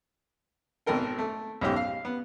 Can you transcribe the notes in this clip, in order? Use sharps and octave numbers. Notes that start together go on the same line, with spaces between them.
G#1 B2 A4 A#4 G5
A3
B1 G#2 C#4 G4
F5
B3